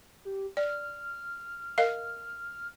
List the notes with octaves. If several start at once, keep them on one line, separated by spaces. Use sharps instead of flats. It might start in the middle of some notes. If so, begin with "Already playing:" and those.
G4
D5 F6
A#4 D#5 F5